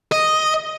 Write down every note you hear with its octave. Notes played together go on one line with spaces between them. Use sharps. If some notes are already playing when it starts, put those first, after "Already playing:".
D#5